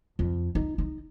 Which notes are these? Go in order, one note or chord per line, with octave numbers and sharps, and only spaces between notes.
F2
D#4
D#4